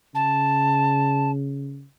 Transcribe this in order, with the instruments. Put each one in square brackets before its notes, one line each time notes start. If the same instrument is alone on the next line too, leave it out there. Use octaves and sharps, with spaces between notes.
[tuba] C#3 [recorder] A5